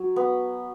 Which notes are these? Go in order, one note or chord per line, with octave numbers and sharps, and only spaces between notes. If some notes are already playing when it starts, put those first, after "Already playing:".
Already playing: F#3
B3